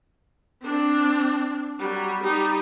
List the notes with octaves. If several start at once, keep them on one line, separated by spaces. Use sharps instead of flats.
C4 D4
F#3 G3
G3 D#4